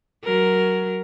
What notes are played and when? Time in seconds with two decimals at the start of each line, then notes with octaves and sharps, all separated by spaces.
0.25 F#3 A#4